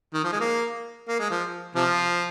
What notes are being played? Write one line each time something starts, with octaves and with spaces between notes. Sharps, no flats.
D#3
F3
G#3
A#3
A#3
G#3
F3
C3 F3